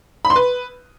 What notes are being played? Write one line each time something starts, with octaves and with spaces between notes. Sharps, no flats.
B5
C6
B4